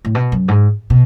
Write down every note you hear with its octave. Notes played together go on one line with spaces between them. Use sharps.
A2
B2
F#2
G#2
B2